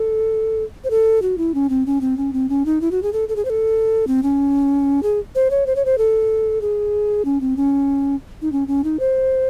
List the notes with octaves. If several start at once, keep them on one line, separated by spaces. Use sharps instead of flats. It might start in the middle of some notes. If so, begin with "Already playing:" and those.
Already playing: A4
C5
A4
F#4
E4
C#4
C4
C#4
C4
C#4
C4
C#4
D#4
E4
F#4
G#4
A4
A4
G#4
C5
A4
C4
C#4
G#4
C5
C#5
C5
C#5
C5
A4
G#4
C#4
C4
C#4
D#4
C#4
C#4
D#4
C5